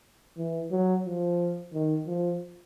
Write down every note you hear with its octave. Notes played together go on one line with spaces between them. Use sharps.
E3
F#3
F3
D#3
F3